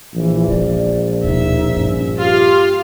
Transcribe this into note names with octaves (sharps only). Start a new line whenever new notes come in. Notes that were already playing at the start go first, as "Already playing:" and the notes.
A#1 E3
G#3 B3 D5
D#2 B2 D#4 E5
G2 C#4
F4 G4 F5